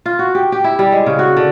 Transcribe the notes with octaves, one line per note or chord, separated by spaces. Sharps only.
F4
F#4
G4
G4
E4
G3
G#3
C#3
F#4
D3